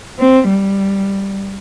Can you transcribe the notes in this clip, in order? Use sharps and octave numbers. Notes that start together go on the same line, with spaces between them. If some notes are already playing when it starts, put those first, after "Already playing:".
C4
G3